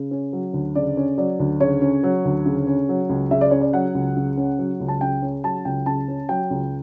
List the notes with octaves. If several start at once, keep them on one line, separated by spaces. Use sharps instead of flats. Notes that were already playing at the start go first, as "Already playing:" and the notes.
Already playing: C#3
C#4
F#3
D2
C#3 D5
C#4
F#3 D5
D2
C#3 C#5
C#4
F#3
D2
C#3
C#4
F#3
C#2
C#3 E5
D5
C#4 C#5
D5
F#3 F#5
C#2
C#3
C#4
F#3
C#2
A5
C#3 G5
C#4
F#3 A5
C#2 G5
C#3 A5
C#4
F#3 G5
C#2